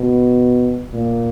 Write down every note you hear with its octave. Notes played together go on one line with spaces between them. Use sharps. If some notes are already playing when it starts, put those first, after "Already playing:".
Already playing: B2
A#2